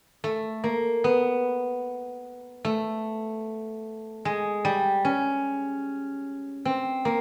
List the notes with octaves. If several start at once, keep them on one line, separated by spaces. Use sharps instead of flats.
A3
A#3
B3
A3
G#3
G3
C#4
C4
A#3